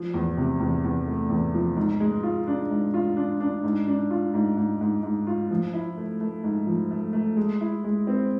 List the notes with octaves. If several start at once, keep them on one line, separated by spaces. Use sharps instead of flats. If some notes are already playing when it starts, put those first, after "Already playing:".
Already playing: F3
E2
C3
E2
E2
A3
E2
F3
G#2
G#3
F4
D4
G#2
F4
D4
D4
G#2
D4
F4
G#2
G#2
G#2
G#2
F4
F3
E4
A3
A3
G#2
F3
A3
A3
G#3
E4
G#3
C4